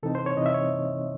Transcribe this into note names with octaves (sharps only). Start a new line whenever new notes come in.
C3 E3 C4 D#4 A4
C5
C#5
C3 E3 C4 D#4 D#5
E5
C#5